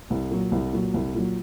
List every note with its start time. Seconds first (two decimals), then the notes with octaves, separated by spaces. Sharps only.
0.10 C2
0.31 A#2 F#3
0.52 C2
0.73 A#2 F#3
0.94 C2
1.14 A#2 F#3